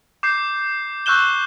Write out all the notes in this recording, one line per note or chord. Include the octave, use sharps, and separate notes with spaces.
D6 G6 C7
C#6 E6 F#6 G6 E7 G7